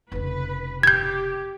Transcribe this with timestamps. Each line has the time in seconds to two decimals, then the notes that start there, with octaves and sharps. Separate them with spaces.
0.12 F1 C#3 B4
0.83 G4 G6 G#6